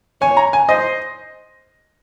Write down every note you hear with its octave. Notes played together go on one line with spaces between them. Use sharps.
C#5 G#5
A#5
G#5
C5 D#5